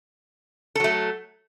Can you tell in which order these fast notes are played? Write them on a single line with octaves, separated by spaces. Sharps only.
A4 F#3 A3